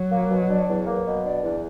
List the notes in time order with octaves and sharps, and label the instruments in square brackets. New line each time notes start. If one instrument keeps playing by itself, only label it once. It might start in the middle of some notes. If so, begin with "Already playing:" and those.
Already playing: [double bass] F#3
[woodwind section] A#3
B2
D4
E2
A#3
B2
D4
E2